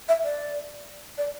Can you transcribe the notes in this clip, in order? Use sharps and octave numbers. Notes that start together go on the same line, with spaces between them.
E5
D5
D5